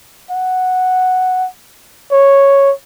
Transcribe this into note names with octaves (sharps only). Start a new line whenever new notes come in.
F#5
C#5